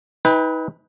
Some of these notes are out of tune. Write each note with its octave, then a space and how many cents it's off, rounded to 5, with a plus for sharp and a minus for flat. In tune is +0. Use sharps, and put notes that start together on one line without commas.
D#4 +35 B4 +0 G5 +30